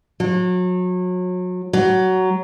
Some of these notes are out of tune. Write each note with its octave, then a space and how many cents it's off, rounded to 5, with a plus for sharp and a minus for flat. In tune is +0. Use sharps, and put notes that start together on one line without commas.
F#3 -30
F#3 +15